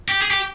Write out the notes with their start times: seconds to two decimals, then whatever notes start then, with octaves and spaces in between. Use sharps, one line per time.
0.09 G4
0.21 G#4
0.31 G4